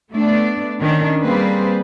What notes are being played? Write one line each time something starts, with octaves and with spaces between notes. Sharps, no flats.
A3 B3 D4 D5
D#3 C#4 D4
G3 A#3 C4 G#4 B4 C5